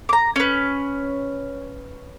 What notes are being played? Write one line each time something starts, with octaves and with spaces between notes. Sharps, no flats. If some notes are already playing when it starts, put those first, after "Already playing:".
A#5 D6
C#4 B4